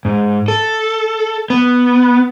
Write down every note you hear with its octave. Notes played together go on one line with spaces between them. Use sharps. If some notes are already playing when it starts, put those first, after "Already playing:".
G#2
A4
B3